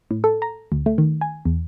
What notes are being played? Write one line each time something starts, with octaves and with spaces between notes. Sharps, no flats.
A2
A4
A#5
D2
A3
D#3
G#5
E2